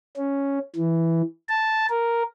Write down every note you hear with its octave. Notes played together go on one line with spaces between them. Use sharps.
C#4
E3
A5
A#4